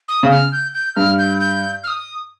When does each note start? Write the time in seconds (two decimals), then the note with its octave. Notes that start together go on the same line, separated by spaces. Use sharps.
0.08 D#6
0.23 C#3
0.31 F6
0.52 G6
0.74 G6
0.96 G2 F6
1.18 G6
1.40 G6
1.84 F6
1.87 D#6